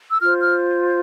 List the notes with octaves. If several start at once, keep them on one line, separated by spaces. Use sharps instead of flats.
E6
F4 C5 F6
F6